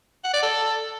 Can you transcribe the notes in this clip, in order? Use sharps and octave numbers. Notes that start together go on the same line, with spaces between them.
F#5
D5
A4